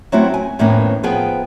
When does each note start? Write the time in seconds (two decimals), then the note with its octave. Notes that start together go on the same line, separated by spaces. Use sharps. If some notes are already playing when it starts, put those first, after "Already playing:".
0.12 F#3 A3 C4 C#4 E4 F#4
0.34 G#5
0.59 F2 A2 D#3 A#3 B3 C#4
1.03 F3 B3 G#4 B4 G5